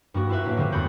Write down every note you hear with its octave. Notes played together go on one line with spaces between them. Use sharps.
G2 A#3 F#4
E4 F4 B4 E5
A2 A#3
D3 G3 C4
E2 G#3 A3 F#4 B5 G6